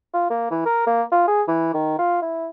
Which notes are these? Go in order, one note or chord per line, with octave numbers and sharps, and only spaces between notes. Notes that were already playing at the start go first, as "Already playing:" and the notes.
F4
A#3
E3
A#4
A#3
F4
G#4
E3
D#3
F4
E4